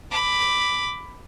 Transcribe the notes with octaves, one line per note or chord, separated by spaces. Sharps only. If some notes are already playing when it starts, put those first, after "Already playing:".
B5 D6